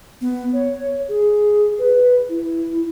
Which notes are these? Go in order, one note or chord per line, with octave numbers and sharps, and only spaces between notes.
B3
C#5
G#4
B4
E4